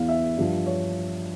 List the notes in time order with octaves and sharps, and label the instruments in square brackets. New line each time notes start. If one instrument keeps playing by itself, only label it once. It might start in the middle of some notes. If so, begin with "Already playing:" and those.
Already playing: [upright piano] E2 E3 F5
E5
G2 F3
C#5